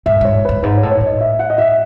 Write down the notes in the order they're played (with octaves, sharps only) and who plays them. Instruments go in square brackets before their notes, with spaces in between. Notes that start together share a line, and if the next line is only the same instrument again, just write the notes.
[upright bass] G#2 [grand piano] E5
[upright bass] G#2 [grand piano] C#5
[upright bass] F#2 [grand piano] B4
[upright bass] G#2 [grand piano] B4
[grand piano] C#5
[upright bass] A2
[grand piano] C#5
[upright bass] A2
[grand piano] D#5
E5
F#5
D#5
E5